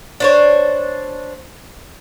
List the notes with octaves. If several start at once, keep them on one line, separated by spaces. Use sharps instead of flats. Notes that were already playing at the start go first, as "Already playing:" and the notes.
D4 C5 C#5